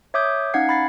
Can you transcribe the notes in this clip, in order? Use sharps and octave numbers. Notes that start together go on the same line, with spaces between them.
C#5 E5 D6 D#6 G6
C#4 D#4 F5 F#5 G#6 C7
B5 A6 C7